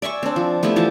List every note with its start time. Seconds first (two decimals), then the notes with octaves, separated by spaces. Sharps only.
0.02 D5 E5 G#5 C#6
0.23 C4 D4
0.36 F3
0.63 A3 B3 E4 G4
0.76 E3 F3 A5